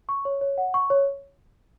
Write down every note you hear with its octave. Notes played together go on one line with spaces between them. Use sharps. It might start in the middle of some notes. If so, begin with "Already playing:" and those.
C#6
C#5
C#5
F#5
C#6
C#5